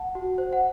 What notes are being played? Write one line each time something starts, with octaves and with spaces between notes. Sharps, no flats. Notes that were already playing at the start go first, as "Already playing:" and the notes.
Already playing: F#5 A5
F#4
C5
F#5